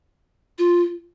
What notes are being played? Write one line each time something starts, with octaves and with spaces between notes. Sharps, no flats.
F4